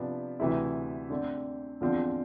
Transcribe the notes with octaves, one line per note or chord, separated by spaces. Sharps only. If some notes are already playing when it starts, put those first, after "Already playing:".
Already playing: C3 F3 B3 D4
D2 C3 E3 A3 E4
D3 A3 C4
E2 D3 F3 C4